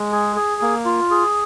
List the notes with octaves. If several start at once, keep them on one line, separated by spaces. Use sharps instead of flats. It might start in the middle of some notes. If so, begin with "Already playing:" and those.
Already playing: G#3
G#4
G#4
A#3
F4
G#4